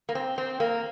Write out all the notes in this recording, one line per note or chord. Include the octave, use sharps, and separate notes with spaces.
A#3
C4
C4
A#3